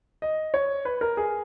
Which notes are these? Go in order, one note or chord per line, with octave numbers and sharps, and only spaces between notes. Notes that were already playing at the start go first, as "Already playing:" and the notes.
D#5
C#5
B4
A#4
G#4